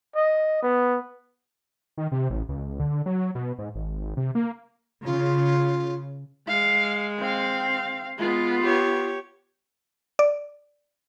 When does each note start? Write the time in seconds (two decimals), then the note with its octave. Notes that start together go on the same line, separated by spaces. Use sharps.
0.15 D#5
0.63 B3
1.98 D#3
2.12 C3
2.30 A1
2.49 C#2
2.80 D3
3.06 F#3
3.35 B2
3.59 G#2
3.75 G#1
4.17 C3
4.35 A#3
5.05 C#3 F4
6.48 G#3 F5
7.18 C4 F5
8.18 G#3 B3 F4
8.62 G4 C#5
10.19 D5